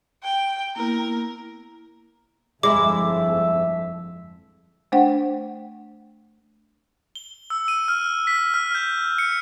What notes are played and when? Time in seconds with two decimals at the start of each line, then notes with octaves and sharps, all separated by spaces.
0.23 G5
0.76 A#3 B3 E4 A#4
2.63 G1 F2 G#3 E4 E5 D6
4.92 A3 D4 C5 F#5 G5
7.15 G7
7.50 E6
7.68 D#7
7.88 F6
8.27 B6
8.54 F6
8.75 G6
9.18 C#7